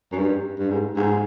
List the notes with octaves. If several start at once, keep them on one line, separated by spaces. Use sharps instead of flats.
F#2
G2
G2
G#2
G#2